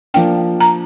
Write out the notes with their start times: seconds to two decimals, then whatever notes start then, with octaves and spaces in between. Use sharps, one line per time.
0.14 F3 A#3 D4 G5
0.61 A#5